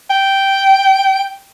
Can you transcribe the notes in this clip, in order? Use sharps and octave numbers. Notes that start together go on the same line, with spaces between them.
G5